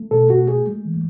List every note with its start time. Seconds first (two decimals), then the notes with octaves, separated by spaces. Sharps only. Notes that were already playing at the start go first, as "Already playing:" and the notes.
Already playing: A3
0.11 B2 A4
0.30 A3 F#4
0.48 A3 G#4
0.67 G#3
0.85 E3